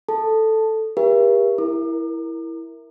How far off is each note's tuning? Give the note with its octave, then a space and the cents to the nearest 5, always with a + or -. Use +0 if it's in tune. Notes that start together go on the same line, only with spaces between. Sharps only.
A4 +0 A5 +5
G4 +30 A#4 +45 E5 +40
E4 +0 A#4 +0 D6 +40